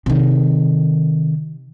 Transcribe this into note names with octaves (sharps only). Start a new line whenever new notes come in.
C3 D#3